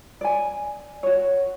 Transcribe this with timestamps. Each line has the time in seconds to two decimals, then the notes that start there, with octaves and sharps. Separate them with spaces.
0.21 D5 G#5
1.03 F#4 C#5